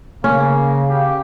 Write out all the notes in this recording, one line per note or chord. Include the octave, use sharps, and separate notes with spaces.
C#3 A#3 C#4
G4 F5